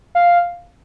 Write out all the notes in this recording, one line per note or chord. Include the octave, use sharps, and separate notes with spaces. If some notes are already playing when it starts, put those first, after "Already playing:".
F5